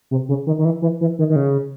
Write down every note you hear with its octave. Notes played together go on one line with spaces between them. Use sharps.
C3
C#3
D#3
D#3
E3
E3
E3
D#3
D#3
C#3